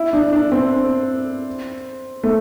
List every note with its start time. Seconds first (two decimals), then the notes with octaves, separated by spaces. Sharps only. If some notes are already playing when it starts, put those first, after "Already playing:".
Already playing: E4
0.13 D4
0.33 D4
0.52 C4
2.24 A3